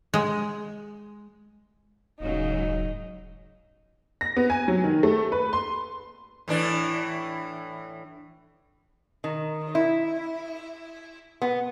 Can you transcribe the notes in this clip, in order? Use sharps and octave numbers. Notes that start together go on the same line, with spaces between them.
G#3
D#1 G#2 C#3 F#3 D#4
A#6
B3
G#5
F#3
D#3
A3
B4
C6
A2 E3 D4
D#3
E4
B3